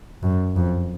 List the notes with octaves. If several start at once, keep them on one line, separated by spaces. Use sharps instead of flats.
F#2
F2